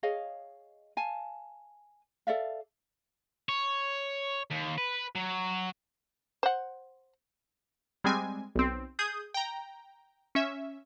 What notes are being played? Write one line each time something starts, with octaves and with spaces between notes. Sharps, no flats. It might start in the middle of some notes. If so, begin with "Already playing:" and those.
G#4 C#5 D#5 F5
F5 G#5 A5
A4 D5 E5 F5
C#5
D#2
B4
F#3
C5 F#5
G3 G#3 C4 G#5
B1 C4
G#4 D#6 G6
G5 A#5
C#4 E5